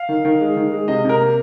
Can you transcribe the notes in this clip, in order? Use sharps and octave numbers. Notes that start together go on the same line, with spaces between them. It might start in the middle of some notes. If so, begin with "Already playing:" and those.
Already playing: F5
D#3
D#3
G#3
D#3
G#3
C3 D#5
C3 A#4
A#3